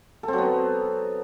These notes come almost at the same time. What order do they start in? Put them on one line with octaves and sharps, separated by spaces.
A4 C4 F#3 B3